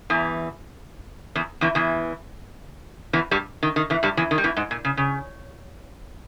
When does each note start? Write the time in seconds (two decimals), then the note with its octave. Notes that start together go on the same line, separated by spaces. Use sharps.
0.10 E2 E3
1.35 E2 E3
1.61 E2 E3
1.75 E2 E3
3.13 E2 E3
3.31 G2 G3
3.63 D#3
3.76 D#3
3.90 E2 E3
4.03 G2 G3
4.17 E2 E3
4.31 D#3
4.38 G3
4.44 E2 E3
4.57 G#2
4.71 A#2
4.85 C#3
4.97 C#3